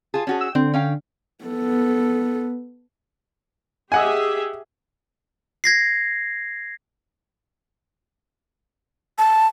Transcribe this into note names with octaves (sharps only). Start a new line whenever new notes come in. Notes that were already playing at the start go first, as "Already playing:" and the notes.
F4 G#4 A5
C#4 F#4 G#4
E6
D3 C4
C#4 F5 G5
B3 A4
G4 G#4 D#5 E5 F#5 G#5
G#6 A#6 C7
A5